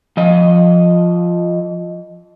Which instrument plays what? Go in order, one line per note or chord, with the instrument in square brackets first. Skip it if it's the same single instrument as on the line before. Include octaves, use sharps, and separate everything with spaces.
[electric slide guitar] F3 D#5